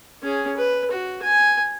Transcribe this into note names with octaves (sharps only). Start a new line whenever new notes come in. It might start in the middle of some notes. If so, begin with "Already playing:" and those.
C#4 G#4
B4
F#4
G#5